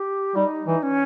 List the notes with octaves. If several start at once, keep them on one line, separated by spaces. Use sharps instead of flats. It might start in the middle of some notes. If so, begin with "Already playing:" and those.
Already playing: G4
G3 D#4
E3
C#4